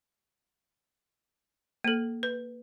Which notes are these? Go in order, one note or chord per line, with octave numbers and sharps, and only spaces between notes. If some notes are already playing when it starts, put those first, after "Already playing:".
A#3 A4
B4